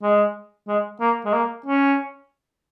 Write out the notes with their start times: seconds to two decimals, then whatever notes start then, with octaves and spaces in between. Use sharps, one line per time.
0.02 G#3
0.68 G#3
1.00 A#3
1.25 G#3
1.33 A#3
1.66 C#4